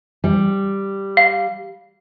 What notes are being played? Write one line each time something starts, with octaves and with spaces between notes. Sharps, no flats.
G3
F5